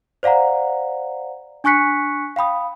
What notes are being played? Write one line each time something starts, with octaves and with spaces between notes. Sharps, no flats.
C5 D5 F5 F#5 A#5
D4 G#5 C#6 F#6 B6 C#7
F5 G5 B5 D#6